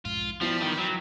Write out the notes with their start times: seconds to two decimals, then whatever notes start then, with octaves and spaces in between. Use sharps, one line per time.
0.05 B1 F2 G#2 F4
0.41 F3 G3 B3 E4 F#4
0.62 D#3
0.79 F#3